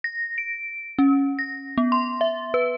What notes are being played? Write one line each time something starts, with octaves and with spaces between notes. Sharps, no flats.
A#6
D7
C#4
A#6
B3
C6
E5
B4